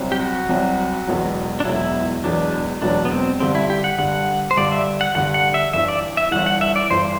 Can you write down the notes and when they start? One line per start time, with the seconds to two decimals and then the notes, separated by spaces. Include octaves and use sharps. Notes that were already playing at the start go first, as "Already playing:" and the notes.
Already playing: C2 C3 F#3
0.12 G4
0.20 F#4
0.49 C2 C3 F#3
1.07 E1 E2 B2 F#3
1.60 D4
1.65 E1 E2 B2 F#3 E4
2.24 E1 E2 B2 F#3 D4
2.82 E1 E2 B2 F#3 D4
3.05 B3
3.11 C4
3.40 G2 D3 G3 C4
3.55 E4
3.70 G4
3.84 F#5
3.98 G2 D3 G3 F#5
4.51 C5
4.57 G2 D3 G3 D5
4.72 E5
5.01 F#5
5.15 G2 D3 G3 F#5
5.34 F#5
5.54 E5
5.73 G1 G2 E3 E5
5.88 D5
6.17 E5
6.31 G1 G2 E3 F#5
6.46 F#5
6.61 E5
6.76 D5
6.90 G1 G2 E3 C5